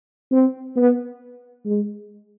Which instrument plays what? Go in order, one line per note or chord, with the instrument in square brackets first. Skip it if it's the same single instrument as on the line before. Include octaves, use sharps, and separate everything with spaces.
[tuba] C4
B3
G#3